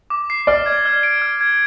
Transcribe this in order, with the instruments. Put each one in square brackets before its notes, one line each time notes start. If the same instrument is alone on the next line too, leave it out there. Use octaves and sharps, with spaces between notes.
[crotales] D6
C7
[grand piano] D5 [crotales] F6
[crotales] G#6
F6
D7
F6
G#6